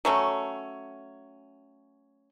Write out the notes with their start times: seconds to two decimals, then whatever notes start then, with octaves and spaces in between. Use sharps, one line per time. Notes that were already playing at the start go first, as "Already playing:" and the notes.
0.05 F#3 A3 C#4